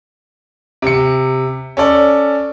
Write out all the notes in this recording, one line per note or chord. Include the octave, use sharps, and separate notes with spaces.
C3 C#7
C#4 A4 D5